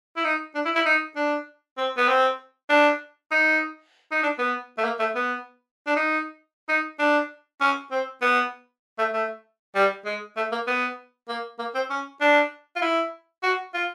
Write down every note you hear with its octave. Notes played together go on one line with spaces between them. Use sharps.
E4
D#4
D4
E4
E4
D#4
D4
C4
B3
C4
D4
D#4
D#4
D4
B3
A3
A#3
A3
B3
D4
D#4
D#4
D4
C#4
C4
B3
A3
A3
G3
G#3
A3
A#3
B3
A#3
A#3
C4
C#4
D4
F4
E4
F#4
F4